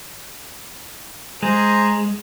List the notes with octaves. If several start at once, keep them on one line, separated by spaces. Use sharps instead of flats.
G#3 G#4 C5 A#5